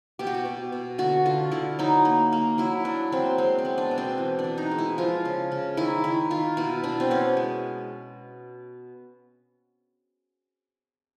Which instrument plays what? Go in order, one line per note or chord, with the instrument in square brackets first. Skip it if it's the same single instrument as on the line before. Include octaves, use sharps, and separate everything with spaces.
[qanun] B2 G4
F#4
G4
B2
B2
D3 F#4
D3 F4
D3 E4
F#3 D#4
A#3
A#3
F#3 E4
F#3 D4
F#3 C4
G#3 C4
C4
B3
D4
B2
C4
E3
D4
E3
D#4
G#3
E4
F3 F4
C#3
C#3
D#3 E4
D#3 E4
D#3 F4
B2 E4
B2 D4
C4
B3 C#4
G#3